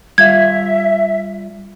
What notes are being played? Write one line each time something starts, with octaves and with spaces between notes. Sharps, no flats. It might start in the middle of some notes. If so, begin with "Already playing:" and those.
G3 F4 E5 F5 G#6